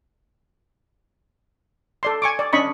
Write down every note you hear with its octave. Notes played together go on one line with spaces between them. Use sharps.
A4 D5 C6
G#5 C#6 D6
D5
C#4 D4 D#5 B5 C#6